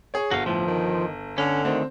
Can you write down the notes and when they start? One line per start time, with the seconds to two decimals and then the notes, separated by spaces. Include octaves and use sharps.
0.14 G#4 C#5
0.31 G1 F#4 F5
0.46 A2 F3
0.68 D#3
1.38 D3 C#4
1.65 D2 D#3 C4